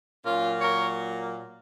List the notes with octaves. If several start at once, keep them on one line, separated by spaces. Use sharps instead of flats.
A#2 F#3 A#3 C#4 F4
A#4 C#5